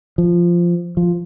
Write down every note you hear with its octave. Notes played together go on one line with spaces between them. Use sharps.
F3
F3